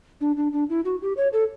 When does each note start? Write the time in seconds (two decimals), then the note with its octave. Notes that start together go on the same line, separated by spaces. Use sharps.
0.21 D4
0.37 D4
0.53 D4
0.69 E4
0.85 F#4
1.02 G4
1.17 C#5
1.33 A4